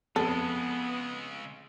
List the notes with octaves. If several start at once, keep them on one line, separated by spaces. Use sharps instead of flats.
F2 C#3 G#3 B3 A4